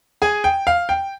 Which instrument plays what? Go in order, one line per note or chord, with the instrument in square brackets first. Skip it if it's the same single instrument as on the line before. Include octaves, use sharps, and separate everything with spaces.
[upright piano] G#4 G#5
G5
F5
G5